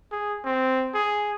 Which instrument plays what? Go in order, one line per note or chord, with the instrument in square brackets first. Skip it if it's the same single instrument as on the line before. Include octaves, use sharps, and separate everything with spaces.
[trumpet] G#4
C4
G#4